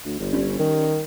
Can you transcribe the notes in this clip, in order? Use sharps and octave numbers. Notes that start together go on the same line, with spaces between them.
D2
G1
G3 C#4
D#3